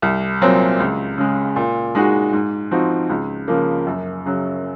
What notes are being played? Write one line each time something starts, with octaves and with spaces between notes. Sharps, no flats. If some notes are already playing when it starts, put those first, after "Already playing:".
C2
A#2 F#3 C4
C#2
C#3 G#3
A#2
G#3 D#4 F#4
G#2
F3 C4 D#4 F#4
C#2
C#3 F3 A#3
F#2
C#3 F#3